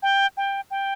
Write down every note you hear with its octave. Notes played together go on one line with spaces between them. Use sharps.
G5
G5
G5